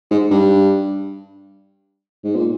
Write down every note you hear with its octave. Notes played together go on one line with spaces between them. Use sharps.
G#2
G2
G#2
A#2